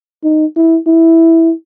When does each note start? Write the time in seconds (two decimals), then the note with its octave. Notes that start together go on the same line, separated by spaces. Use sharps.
0.24 D#4
0.56 E4
0.87 E4